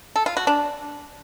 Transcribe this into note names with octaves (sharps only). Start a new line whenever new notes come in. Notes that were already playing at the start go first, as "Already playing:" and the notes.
A4
F4
F#4
D4